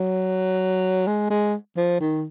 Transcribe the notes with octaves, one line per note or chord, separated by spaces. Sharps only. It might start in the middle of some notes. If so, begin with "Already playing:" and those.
Already playing: F#3
G#3
G#3
F3
D#3